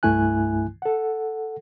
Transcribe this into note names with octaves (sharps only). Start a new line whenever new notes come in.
C2 G2 A3 E4 G#5 F#6
A4 F#5